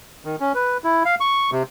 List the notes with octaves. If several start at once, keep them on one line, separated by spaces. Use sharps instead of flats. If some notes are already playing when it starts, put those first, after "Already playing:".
D#3
C#4
B4
E4
F5
C#6
C3